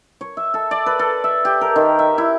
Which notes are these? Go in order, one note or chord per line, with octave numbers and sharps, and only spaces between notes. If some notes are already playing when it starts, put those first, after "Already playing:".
C#5
E5
A4
D5
B4
A4
E5
G4
A#4
D#3
E5
E4